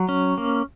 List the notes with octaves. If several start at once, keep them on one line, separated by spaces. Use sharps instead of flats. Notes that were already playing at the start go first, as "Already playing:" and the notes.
Already playing: F#3
C#4
A#3